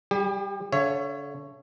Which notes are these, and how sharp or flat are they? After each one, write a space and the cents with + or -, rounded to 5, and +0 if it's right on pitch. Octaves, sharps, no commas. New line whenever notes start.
G3 +0 G4 +45
D3 -35 C#5 +0 E5 +35